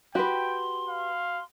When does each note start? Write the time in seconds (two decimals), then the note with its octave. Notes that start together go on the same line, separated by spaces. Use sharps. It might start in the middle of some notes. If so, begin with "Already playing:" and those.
0.15 F#4 G4 B4 G5 C6
0.89 F5